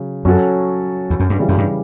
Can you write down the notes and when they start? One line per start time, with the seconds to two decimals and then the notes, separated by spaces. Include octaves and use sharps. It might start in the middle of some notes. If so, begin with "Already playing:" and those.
Already playing: C#3 F#3
0.25 F#2 F#3 C#4 F#4 A4
1.10 E2
1.20 F#2
1.30 G2
1.39 C#3 E3 G3
1.48 F#2
1.58 G2